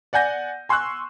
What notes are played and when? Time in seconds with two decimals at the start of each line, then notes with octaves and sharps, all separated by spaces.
0.13 D5 F#5 G#5 G6 A#6
0.69 G#5 C6 C#6 E6 F#6